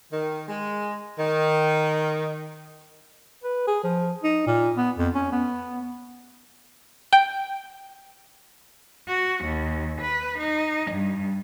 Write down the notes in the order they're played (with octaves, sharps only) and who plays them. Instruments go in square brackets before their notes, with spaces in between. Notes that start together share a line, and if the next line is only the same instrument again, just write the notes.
[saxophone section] D#3
G#3
D#3
[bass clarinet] B4
G#4
F3
D#4
A#2
B3
F2
C#4
B3
[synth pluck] G5
[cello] F#4
D#2
B4
D#4
G2